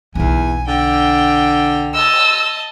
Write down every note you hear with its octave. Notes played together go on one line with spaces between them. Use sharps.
B1 E2 C4 G#5
D3 G5
D#5 A5 E6